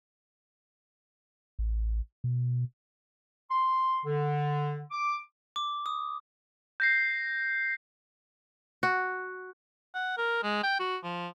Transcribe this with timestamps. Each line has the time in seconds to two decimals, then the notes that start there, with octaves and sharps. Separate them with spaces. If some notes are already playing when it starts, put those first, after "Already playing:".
1.59 A1
2.24 B2
3.51 C6
4.05 D3
4.91 D6
5.56 D6
5.86 D#6
6.80 G6 A#6 C7
8.83 F#4
9.94 F#5
10.17 A#4
10.43 G#3
10.63 G5
10.79 F#4
11.03 F3